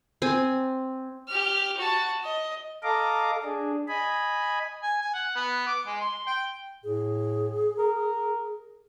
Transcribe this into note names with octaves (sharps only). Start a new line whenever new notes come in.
C4 G#5
G4 F6
F#4 A5
D#5
A4 D#5 F5 A#5 D6
D4 G#4
D#5 G#5 B5
G#5
G#5
F#5
B3
D6
G#3
C6
G5
A2 G#4
A#4